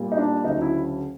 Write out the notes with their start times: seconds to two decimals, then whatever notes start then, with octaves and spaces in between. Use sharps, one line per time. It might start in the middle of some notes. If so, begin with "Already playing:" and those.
Already playing: A#2 G3 A#3
0.12 D#4
0.18 D4
0.44 D2 C#3 F#3 A3 D#4
0.62 E4